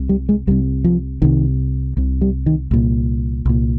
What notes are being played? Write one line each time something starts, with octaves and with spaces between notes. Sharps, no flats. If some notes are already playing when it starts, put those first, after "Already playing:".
Already playing: C2 C3
G3
G#3
C2 C3 G3
F3
C2 C3 D#3
C2 C3
G3
D#3
C2 A#2
C2 A#2